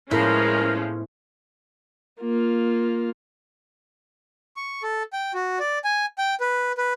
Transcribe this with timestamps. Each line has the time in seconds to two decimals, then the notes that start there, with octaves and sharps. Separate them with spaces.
0.11 A2 F3 G#3 A#3 B3 C#4 E4 A#4
2.21 A#3 F4
4.56 C#6
4.83 A4
5.13 G5
5.34 F#4
5.59 D5
5.84 G#5
6.18 G5
6.40 B4
6.78 B4